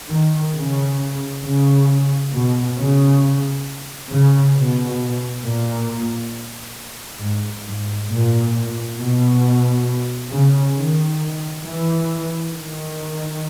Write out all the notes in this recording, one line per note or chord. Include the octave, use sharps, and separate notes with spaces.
D#3
C#3
C#3
B2
C#3
C#3
B2
A#2
G#2
G#2
A#2
B2
C#3
D#3
E3
D#3